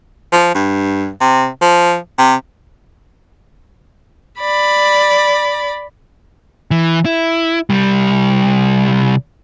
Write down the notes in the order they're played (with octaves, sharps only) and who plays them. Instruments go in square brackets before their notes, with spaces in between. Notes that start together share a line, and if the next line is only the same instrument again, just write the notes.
[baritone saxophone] F3
G2
C3
F3
C3
[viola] D5 B5
[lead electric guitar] E3
E4
C2 G3